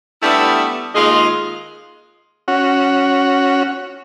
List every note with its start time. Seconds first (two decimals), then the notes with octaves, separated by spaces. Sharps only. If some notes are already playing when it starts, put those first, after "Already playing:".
0.22 G3 A3 B3 D4 E4
0.95 D#2 G#3 F4 G#4 D#5
2.48 C#4 F#4